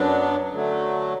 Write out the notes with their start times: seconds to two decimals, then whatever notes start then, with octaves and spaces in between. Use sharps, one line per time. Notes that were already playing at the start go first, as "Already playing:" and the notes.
Already playing: F#2 F#3 B3 D4
0.52 D3 F#3 A3